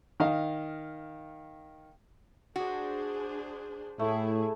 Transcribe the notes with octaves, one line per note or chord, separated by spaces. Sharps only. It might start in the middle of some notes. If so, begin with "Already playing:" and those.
D#3 D#5 F5
D4 F#4 G#4 C5
A2 A3 E4 G#4